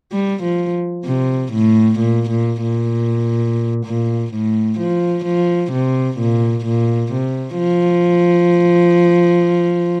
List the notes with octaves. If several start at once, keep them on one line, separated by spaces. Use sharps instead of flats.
G3
F3
C3
A2
A#2
A#2
A#2
A#2
A2
F3
F3
C3
A#2
A#2
C3
F3